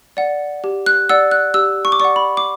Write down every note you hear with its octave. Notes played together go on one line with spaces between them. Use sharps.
D5 F#5
G4
F#6
D5 F#5 E6
F#6
G4 E6
C#6
D6
D5 F#5 C#6
B5
D6